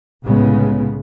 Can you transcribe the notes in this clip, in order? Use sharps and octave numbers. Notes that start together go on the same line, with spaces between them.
C2 A2 C#3 G#3 B3